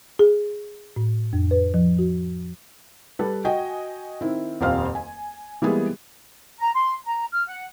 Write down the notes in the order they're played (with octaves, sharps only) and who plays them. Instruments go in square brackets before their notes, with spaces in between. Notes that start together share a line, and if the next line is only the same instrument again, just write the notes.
[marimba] G#4
A2
F2
B4
F3
F#4
[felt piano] G3 A4 B4
F#4 D#5 G5 G#5
D#3 C4 E4
D#1 F2 C4 G4 F5 F6
G#5
E3 G3 G#3 A#3 B3 G#4
[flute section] A#5
C6
A#5
F6
F#5